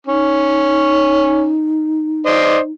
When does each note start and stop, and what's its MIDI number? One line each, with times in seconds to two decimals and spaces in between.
0.07 1.55 61
0.07 2.71 63
2.26 2.57 72
2.26 2.57 74
2.26 2.57 75